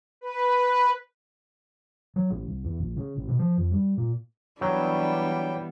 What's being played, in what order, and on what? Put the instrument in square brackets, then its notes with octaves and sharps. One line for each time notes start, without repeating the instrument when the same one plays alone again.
[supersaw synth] B4
[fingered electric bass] F#3
A1
C2
E2
A#1
C#3
A1
B2
F3
F2
G3
A#2
[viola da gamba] E3 G3 B3 [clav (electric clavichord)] F#3 [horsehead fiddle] D4 [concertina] G5